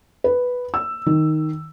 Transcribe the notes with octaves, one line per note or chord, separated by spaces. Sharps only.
B4
E6
D#3